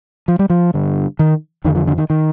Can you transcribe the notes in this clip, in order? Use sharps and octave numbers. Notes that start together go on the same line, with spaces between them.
F3
G3
F3
G2 D3
D#3
F2 D3 D#3
F3
D3
D#3
D#3